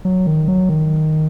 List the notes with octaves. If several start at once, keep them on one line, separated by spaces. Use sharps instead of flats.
F#3
D#3
F#3
D#3